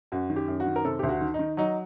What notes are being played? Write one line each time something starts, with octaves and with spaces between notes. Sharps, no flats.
F#2 F#4
D#3
G4
F#2
F#4
D#3
A#4
C3 A4
D2 G4
F#4
D#3
D#3 D#4
F#3 D#4